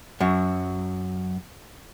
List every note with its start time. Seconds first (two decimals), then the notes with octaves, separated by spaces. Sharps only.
0.20 F#2 F#3